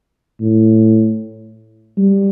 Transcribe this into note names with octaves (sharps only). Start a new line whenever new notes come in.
A2
G3